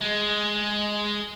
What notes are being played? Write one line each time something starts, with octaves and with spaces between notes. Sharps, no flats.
G#3